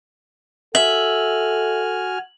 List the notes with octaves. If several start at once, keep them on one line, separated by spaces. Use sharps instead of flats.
F#4 A4 E5 G#5 F6 F#7